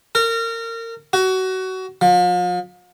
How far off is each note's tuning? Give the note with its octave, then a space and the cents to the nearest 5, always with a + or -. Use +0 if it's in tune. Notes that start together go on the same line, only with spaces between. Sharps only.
A#4 -30
F#4 +25
F3 +40